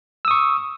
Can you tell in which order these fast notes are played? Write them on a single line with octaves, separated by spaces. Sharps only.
E6 D#6 C#6